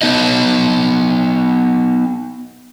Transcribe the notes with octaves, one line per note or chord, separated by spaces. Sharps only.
B3 D#4 D#5